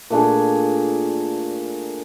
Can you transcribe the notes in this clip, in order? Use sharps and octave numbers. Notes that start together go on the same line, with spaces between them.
A#2 A3 D4 G#4